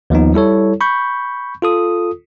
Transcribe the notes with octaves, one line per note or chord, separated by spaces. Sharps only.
D#2 F3 B3 D#4
G3 E4 A4 C#5
B5 C#6 G6
F4 A4 D#6